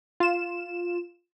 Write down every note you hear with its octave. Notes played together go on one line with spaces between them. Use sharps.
F4 E7